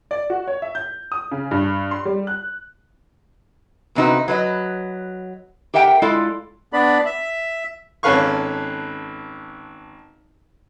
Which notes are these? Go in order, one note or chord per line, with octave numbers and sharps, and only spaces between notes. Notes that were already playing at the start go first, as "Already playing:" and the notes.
D5
F#4
C#5
E5
G6
D#6
C#3
G2
C6
G3
F#6
E2 C3 C4 D#4 F#4 B4
F#3 B4 D#5
G4 A#4 E5 F#5 G5
G#3 E4 F4 A4 D5 F5
B3 D4 D5 B5
E5
G#1 C#4 A4 B4 F5 C#6